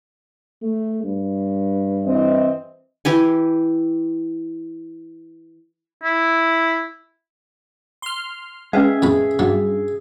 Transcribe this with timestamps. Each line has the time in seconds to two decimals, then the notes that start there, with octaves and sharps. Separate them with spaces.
0.62 A3
1.03 G2
2.05 E3 C4 D#5
3.05 E3 G4 G#5
6.03 E4
8.02 C6 F6
8.73 G#3 C#4 G#4 B4 E5 F5
9.02 F2 A2 B5
9.39 G2 F#3